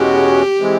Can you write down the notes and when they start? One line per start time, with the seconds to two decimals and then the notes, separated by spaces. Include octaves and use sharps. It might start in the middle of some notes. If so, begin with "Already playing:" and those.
Already playing: E2 B2 G#3 C#4 F#4 G4
0.59 C3 E3 G#3